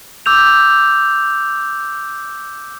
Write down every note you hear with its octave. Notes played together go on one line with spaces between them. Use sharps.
D6 E6 G6 F7